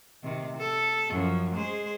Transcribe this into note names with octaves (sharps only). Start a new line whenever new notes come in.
C3 D#3
A4
F#2 F3
G#3 G#4 C5